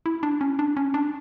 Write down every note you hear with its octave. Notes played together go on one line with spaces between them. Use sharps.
E4
D4
C#4
D4
C#4
D4